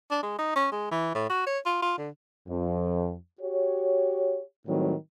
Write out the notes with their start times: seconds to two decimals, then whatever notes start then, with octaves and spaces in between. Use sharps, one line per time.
0.11 D4
0.23 G#3
0.39 D#4
0.56 C#4
0.72 G#3
0.91 E3
1.15 A2
1.30 F#4
1.47 C#5
1.66 F4
1.82 F4
1.98 D3
2.48 F2
3.41 F#4 G4 C#5
4.67 A2 D#3 F#3 G3 C4